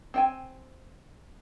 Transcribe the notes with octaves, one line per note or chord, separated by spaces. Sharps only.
C4 G5 G#5